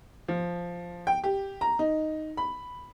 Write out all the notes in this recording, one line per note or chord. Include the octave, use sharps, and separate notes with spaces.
F3
G5
G4
A#5
D#4
B5